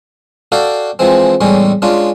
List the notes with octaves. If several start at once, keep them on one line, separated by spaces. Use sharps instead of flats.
F#4 A4 D5 F5 G5
E3 F3 G#3 C4
E2 A2 G3 G#3 C#4
G#3 C#4 D4 F4